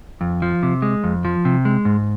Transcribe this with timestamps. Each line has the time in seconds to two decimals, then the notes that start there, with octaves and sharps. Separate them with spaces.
0.21 F2
0.42 F3
0.63 C3
0.82 G#3
1.04 F2
1.25 F3
1.45 C3
1.65 G#3
1.85 G#2